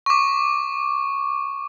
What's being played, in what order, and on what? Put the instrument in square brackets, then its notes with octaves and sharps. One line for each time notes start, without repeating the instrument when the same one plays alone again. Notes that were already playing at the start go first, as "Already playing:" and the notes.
[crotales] C#6 D6